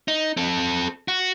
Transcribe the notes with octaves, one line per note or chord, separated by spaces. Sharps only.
D#4
C4 A4
F#4